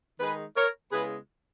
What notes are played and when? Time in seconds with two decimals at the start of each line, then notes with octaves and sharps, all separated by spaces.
0.20 D#3 G#3 D#4 G#4 B4
0.56 A#4 C#5
0.91 C#3 G#3 B3 E4 G#4 B4